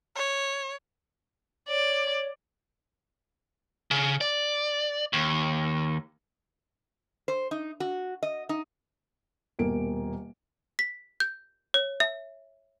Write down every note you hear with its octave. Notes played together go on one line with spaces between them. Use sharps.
C#5
C#5 D5
C#3
D5
D#2
C5
D#4
F#4
D#5
D#4
D#1 B2 A#3 D7
B6
G6
C#5
E5